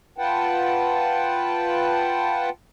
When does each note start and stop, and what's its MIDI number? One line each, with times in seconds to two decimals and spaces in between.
0.18 2.49 65
0.18 2.49 71
0.18 2.49 78
0.18 2.49 79
0.18 2.49 81